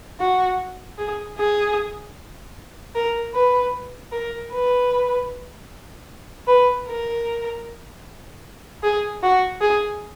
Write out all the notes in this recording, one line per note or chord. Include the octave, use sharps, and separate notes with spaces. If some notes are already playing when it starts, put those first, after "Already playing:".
F#4
G#4
G#4
A#4
B4
A#4
B4
B4
A#4
G#4
F#4
G#4